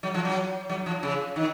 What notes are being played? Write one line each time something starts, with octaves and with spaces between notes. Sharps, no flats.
F#3
F3
F#3
F#3
F3
C#3
D#3